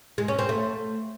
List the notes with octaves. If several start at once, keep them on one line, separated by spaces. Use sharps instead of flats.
G#3
C#4
C4
A3